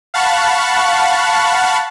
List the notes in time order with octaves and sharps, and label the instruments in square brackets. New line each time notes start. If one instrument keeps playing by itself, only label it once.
[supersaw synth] F5 F#5 A5 B5 C#6 F#6